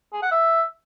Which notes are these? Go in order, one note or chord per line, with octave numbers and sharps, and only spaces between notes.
G#4
F#5
E5